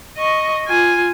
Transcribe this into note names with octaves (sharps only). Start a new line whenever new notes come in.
D#5 C#6
F4 G#5